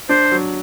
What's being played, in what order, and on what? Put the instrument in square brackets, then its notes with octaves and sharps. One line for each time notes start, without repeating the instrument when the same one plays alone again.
[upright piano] D4 [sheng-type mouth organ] C5
[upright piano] F#3